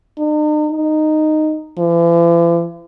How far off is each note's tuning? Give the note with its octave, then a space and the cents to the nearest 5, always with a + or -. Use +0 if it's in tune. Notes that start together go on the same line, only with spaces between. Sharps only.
D#4 -45
D#4 -10
E3 +45